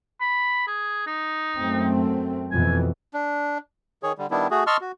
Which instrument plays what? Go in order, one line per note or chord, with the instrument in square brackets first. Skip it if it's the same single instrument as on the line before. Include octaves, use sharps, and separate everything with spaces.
[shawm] B5
G#4
D#4
[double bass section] F#2 A3 C4
[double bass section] F2 B2 E3 [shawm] G#5
[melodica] D4
[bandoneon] D#3 G#4 C#5
D3 G3
D#3 G3 B3 D4 E4
A3 F#4 G#4
D#5 A5 C6 C#6 E6 F6
F#4